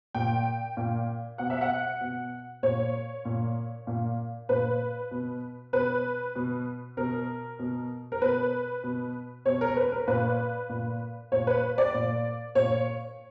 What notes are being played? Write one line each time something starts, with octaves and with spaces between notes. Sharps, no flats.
A#2 G5
A#2
B2 F#5
E5
F#5
B2
A#2 C#5
A#2
A#2
A#2 B4
B2
B2 B4
B2
B2 A#4
B2
A#4
B2 B4
B2
B2 C#5
A#4
B4
A#4
A#2 B4
A#2
A#2 C#5
B4
D5
A#2
A#2 C#5